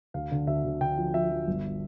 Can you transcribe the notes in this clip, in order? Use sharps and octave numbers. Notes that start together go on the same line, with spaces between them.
D2 F5
D3
D2 E5
D2
D3 G5
F3
F3 E5
F3
G1